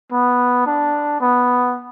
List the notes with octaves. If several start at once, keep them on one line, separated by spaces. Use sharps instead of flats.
B3
D4
B3